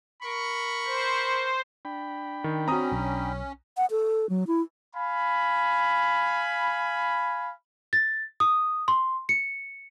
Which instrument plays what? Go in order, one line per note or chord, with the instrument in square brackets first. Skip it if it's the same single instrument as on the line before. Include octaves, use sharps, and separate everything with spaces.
[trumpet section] A#4 B5 C#6
[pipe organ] C5
[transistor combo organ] D4 G5 B5
[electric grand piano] D#3
[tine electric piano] C4 F#4 [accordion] C#4 [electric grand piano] A#5 D#6
[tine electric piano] B1
[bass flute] F#5
A4
F#3
E4
[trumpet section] F5 G#5 B5
[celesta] A6
D#6
C6
C#7